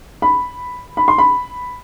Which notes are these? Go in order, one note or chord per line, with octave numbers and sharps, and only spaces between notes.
B5
B5
C6
B5